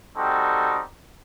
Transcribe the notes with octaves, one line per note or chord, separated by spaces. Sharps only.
G3 C4 D#4 F#4 A4